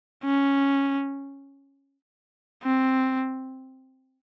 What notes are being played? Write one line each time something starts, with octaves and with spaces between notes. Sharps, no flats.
C#4
C4